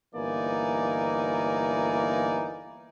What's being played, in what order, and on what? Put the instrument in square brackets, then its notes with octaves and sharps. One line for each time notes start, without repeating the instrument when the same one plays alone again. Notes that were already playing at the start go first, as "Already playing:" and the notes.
[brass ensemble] G1 E3 A#3 D#4 D5 G#5